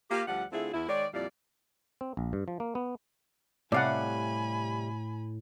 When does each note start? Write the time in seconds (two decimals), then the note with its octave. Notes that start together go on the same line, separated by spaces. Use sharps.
0.10 A#3 F4 G4
0.28 D2 F3 G3 F#5
0.52 D3 A3 C4 E4 F4 G#4
0.73 E2 E4
0.88 D#3 G#3 A#4 C#5 D5
1.13 F2 A#2 G3 E4 D5 F5
2.01 C4
2.17 A#1
2.33 G2
2.48 F3
2.60 A#3
2.75 B3
3.72 A2 C3 G3 D5 F5 F#5 G#5 B5